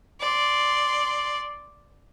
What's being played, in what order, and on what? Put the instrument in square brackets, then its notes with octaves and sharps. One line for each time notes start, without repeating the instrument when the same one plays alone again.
[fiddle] D5 C6